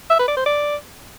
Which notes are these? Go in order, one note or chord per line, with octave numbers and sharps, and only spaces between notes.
E5
B4
D5
C5
D5